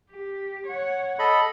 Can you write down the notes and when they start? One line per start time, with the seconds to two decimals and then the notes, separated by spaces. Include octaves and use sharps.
0.11 G4
0.66 C#5 F#5
1.19 A4 D#5 B5